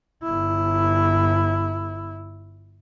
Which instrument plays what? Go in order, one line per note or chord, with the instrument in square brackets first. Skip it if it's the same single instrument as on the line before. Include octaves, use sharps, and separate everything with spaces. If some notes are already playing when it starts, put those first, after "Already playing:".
[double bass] G1 E4